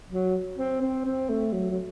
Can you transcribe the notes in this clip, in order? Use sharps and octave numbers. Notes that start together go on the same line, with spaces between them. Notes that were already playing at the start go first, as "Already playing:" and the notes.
F#3
C4
C4
C4
A3
F#3
F#3